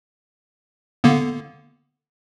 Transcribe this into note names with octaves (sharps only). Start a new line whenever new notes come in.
D3 A#3 B3